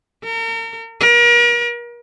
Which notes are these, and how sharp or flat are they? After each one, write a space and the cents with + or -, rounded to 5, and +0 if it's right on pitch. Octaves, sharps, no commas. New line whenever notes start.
A#4 -40
A#4 +40